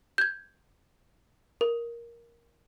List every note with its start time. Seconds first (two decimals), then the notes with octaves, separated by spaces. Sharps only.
0.18 G6 G#6
1.61 A#4